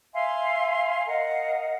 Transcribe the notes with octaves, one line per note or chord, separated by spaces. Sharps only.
E5 F5 G#5 C6
A#4 D#5 F5 F#5